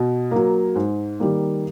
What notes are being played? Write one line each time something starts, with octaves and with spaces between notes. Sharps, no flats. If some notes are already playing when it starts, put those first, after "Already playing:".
Already playing: B2
F#3 A#3
G#2
D#3 G3 A#3